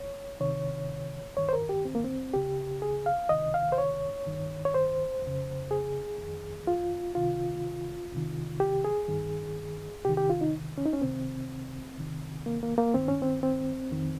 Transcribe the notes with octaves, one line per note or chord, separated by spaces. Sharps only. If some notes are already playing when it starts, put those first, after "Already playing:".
Already playing: C#5
C#2 C3 D#3 C#5
G2 D#3 C#5
C5
A#4
G4
C4
A#3
C4
C#2 C#3 G4
G#4
F5
C#2 C3 D#3 D#5
F5
C5
C#5
G2 D#3
C#5
C5
F2 C#3
G#4
F2 D#3
F4
C#2 C3 D#3 F4
C2 C3 D#3
G4
G#4
G2 D#3
C2 C3 D#3 G4
G4
F4
D#4
C#4
D#4
C#4
C#2 C3 D#3 C4
C#2 C3 D#3
A#3
A#3
A#3
G2 D#3 C4
C#4
C4
C4
F2 D#3